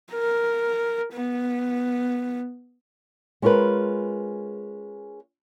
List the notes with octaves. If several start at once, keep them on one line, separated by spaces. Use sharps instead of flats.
A#4
B3
G#3 C#4 F4 A#4 B4